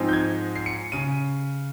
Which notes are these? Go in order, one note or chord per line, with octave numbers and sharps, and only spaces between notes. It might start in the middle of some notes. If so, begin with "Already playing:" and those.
Already playing: G#2 F3 C4 D#4
G6
G#6
C7
C#7
C#3 D#7